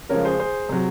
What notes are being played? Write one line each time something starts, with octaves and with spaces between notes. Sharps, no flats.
C#3 F3 G#3 A#4 C#5
G#4 C5
G#4 C5
C3 F#3